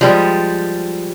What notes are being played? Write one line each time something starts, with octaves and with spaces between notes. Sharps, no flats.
F3 G3 G#3